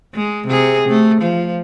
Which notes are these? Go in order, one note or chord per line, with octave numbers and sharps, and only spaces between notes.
G#3
C3 G#4
A3
F3